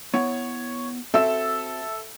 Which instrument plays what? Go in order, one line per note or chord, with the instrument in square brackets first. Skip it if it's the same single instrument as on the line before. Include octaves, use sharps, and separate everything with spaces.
[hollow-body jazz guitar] B3 E4 F#5 [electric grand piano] C#5
[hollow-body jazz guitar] C4 F#4 [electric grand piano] A4 E6 E7 [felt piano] E5